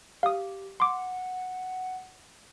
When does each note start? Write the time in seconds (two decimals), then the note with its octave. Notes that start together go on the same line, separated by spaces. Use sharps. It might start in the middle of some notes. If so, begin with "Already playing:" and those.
0.23 G4 F5 D#6
0.80 F#5 C6 D6